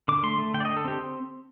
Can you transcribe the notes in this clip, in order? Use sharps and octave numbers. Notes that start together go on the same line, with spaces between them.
D3 D6
A3 C6
A3
D3 G5
D5
D3 D#5
A4
C4 G4